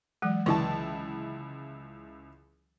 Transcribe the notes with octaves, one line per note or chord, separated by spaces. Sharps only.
E3 F#3 G#3
C#2 D3 E3 E4 A5 C#6